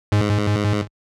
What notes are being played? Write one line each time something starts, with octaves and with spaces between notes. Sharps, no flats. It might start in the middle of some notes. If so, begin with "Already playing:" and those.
G#2